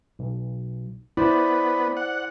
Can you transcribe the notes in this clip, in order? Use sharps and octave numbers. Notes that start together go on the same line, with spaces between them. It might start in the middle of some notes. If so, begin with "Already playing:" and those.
B1
B3 E4 C5 D5
F#5